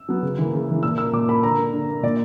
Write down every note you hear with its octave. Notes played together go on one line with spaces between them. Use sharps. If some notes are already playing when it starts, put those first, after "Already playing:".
Already playing: E6
F#3 B3
C#3
E3 A#3
C#3
E3 A#3
A#2 E6
A#3 E6
A#2 D6
A#3 B5
D3 A#5
A#3
D3
A#3
A#2 D5